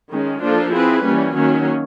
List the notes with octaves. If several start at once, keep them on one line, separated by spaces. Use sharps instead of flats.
D#3 G#3 C#4
F3 A#3 D4 F4 A4
C4 E4 G#4 B4
E3 G3 A#3 C#4
D#3 F#3 A#3 C#4